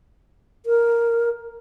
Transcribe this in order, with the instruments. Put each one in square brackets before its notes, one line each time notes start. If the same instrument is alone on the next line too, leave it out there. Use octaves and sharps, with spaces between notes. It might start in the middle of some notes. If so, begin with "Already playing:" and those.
[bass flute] A#4